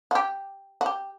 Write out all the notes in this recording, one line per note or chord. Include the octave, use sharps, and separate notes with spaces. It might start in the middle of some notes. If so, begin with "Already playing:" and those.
F#4
G4
F#4
G4